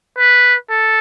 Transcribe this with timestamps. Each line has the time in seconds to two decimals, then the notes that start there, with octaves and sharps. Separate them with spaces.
0.18 B4
0.70 A4